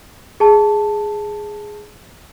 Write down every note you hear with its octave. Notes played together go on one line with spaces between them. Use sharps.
G#4 A5